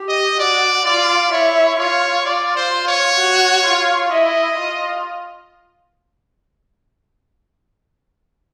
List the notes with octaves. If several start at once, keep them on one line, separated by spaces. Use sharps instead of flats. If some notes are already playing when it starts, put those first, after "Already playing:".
Already playing: G4
D#5
F#4 D5
F4 D5
E4 C#5
F4 C#5
F4 D5
C5
F4
C#5
F#4
F4
E4 D#5
F4